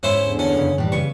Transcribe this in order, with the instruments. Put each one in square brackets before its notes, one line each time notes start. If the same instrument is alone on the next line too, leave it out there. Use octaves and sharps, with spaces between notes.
[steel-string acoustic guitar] G#2 [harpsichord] C#4 E4 C5
[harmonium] E2 D3
[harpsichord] C#4 [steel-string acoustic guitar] A4
[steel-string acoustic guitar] F#2 C#3
[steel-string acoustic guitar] A2 E3 [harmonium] G3
[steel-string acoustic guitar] C#3 B4 [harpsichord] C#6